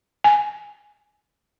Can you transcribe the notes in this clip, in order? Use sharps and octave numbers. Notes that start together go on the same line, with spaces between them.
G#5